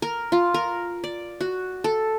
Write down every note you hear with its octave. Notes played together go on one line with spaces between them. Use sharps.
A#4
F4
A#4
D5
F#4
A4